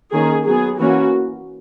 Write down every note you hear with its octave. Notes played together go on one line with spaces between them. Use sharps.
D#3 A#3 C#4 G#4
F#3 B3 G#4
E3 A#3 C#4 F#4